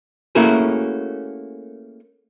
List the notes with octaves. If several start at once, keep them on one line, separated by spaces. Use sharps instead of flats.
A3 A#3 C#4 E4 F#4 G#4